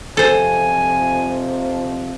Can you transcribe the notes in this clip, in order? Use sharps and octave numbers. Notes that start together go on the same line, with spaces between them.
F2 C3 F3 A4 C5 G#5